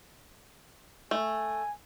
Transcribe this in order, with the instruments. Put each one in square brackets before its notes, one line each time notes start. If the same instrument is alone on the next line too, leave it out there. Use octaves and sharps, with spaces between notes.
[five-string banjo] A3 [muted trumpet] G#5